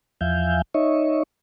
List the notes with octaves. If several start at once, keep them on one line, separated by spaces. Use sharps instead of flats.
E2 F3 E5 F5 G#5 G6
D#4 C#5 D#5 E5 C#6